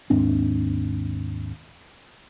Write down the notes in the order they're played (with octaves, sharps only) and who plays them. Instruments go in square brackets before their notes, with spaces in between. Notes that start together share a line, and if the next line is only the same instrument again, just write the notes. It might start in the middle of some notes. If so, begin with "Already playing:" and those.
[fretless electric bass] D#2 G#2 C4 D4